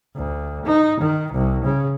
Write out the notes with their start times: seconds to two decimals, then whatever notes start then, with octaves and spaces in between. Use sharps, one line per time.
0.15 D2
0.66 D#4
1.00 D#3
1.33 C2
1.64 C#3